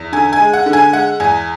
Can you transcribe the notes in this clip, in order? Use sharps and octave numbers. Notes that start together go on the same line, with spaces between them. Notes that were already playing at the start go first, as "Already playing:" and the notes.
Already playing: E2
D3 G#5
G#5
G#3
F#5
D3
G#5
G#3 F#5
E2 G#5